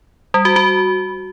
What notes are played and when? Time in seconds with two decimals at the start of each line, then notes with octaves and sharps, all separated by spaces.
0.34 G3
0.45 F#4
0.56 F#4